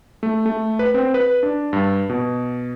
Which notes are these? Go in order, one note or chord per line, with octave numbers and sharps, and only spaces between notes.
A3
A3
B4
C4
B4
D4
G2
B2